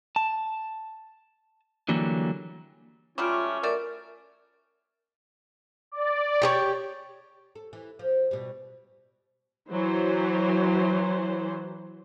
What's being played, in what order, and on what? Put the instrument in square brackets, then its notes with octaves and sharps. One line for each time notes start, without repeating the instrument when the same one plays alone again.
[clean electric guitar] A5
D3 E3 F#3 G3 A#3
[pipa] F#3 G3 A3 [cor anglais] C#4 [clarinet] F4 [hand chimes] D6 F6 D7
[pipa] A3 F#4 D5 [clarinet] A#4
[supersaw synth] D5
[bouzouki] G4 G#4 C#5
[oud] A4
E3
F3
B2 G3
[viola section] E3 F#3 C5